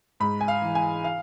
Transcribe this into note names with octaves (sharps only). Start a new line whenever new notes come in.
G#2 B5
G#5
F5
E3
G#5
F5